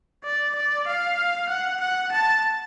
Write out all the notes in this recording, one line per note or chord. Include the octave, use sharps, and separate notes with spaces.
D5
D5
F5
F#5
F#5
A5